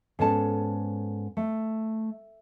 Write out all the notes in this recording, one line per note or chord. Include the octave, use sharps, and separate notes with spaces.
G#2 B3 C#4 A4 A5
A3